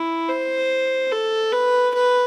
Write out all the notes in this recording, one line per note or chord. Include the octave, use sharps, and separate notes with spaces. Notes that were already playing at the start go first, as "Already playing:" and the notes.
Already playing: E4
C5
A4
B4
B4